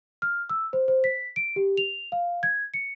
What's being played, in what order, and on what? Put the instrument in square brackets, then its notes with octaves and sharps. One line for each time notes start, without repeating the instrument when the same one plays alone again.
[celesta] F6
E6
C5
C5
B6
D7
G4
F7
F5
G#6
C#7